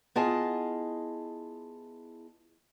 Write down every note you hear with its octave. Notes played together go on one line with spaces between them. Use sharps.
B3 E4 F4 G#4 D#5 A5